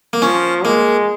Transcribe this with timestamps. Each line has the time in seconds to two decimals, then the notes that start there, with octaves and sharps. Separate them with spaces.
0.13 A#3
0.22 F3 C#4
0.64 G#3 A#3